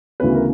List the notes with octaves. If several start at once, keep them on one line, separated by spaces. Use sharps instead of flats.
D2 C#3 E3 B3 B4
A#4